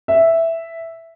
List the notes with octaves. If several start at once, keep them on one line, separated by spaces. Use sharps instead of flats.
E5